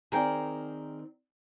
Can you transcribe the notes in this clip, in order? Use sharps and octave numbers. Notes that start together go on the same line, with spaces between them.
D#3 C4 G#4 A#4 D5 G5